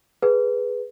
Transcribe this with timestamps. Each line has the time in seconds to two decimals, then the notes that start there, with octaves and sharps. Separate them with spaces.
0.22 G#4 B4